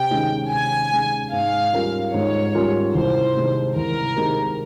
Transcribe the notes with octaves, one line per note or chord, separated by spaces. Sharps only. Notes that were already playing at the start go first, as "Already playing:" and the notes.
Already playing: C3 G5
D#3 G#3 C#4
C3 G#5
D#3 G#3 C#4
G#2 F5
G3 C#4 F4 A#4
G#2 C#5
G3 C#4 F4 A#4
C2 C5
C3 D#3 G#3 D#4
C2 A#4
C3 D#3 G#3 D#4